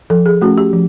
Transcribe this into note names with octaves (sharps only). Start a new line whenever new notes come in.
F3 A4
G#4
A3 C#4 F#4
G4
F3